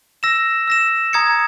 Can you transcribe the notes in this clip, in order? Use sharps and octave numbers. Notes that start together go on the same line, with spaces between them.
E6 A#6 E7
E6 A#6 E7
A#5 D#6 G#6 C#7